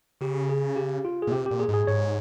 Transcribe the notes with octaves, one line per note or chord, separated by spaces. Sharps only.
C#3 G4
G#4
G4
F4
G#4
A#2
C3 G4
A#2 G4
G#4
G#2
G#4
G#2 C#5